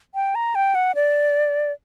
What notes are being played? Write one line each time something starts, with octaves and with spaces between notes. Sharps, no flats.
G5
A#5
G5
F#5
D5